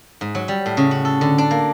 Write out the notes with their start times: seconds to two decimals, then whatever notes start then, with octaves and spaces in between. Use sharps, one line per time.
0.21 G#2
0.35 F#3
0.48 G3
0.66 A2
0.77 C#3
0.91 F#4
1.05 A4
1.21 D3
1.38 D4
1.51 A#3